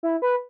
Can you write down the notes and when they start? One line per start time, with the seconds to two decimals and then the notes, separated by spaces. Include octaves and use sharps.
0.03 E4
0.22 B4